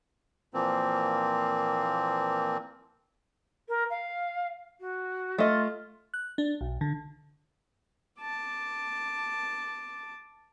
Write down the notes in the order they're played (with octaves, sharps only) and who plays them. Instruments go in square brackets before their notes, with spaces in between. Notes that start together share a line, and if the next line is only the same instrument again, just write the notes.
[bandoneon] A#2 E3 F3 A#3 C4
[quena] A#4
F5
F#4
[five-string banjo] A3 D#5 [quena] F4
[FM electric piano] F#6
D4
B1
D3
[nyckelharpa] A5 D6